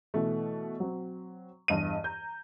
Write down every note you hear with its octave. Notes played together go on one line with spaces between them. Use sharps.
B2 E3 A3
F#3 C4
E2 G2 D#5 D#7
A#5 G6